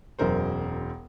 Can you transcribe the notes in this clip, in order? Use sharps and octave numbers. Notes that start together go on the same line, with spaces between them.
E1 F#2 A#4 C5